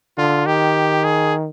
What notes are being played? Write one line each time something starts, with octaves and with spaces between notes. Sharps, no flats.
D3 F4
D#3 G4
G#4